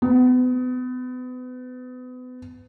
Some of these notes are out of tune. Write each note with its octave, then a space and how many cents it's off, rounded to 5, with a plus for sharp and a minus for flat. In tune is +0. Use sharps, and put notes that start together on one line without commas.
B3 +35